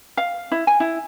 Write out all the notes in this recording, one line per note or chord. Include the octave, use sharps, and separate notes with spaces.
F5
E4
G#5
E4